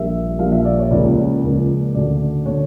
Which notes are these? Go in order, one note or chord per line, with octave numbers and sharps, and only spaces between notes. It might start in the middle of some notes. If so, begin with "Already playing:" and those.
Already playing: A#1 A#2 G3 A#3 E5
A#1 A#2 G3 A#3 F5
E5
D5
C#5
C#2 C#3 F3 A#3 D5
C#2 C#3 F3 A#3
D2 D3 A3 D5
D3 A3 C#5